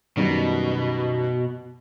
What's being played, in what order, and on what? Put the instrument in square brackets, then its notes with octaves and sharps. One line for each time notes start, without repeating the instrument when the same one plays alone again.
[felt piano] F#2 D#3 G3 [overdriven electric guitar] B2